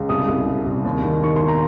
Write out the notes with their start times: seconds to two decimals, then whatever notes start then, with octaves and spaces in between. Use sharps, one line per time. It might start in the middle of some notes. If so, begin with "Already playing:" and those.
Already playing: C#2
0.09 C2 D#6
0.28 C2
0.46 C3
0.66 C2
0.85 D#2
1.04 D#3
1.23 D#3 C#6
1.36 C6
1.41 D#3
1.48 A#5